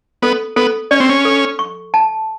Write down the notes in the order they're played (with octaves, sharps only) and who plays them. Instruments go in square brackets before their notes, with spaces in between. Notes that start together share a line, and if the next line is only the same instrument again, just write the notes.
[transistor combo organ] B3 [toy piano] A4
[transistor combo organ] B3 [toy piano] A4
[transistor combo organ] C#4 [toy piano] D5
[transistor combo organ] C4
C#4
[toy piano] A4
C#6
A5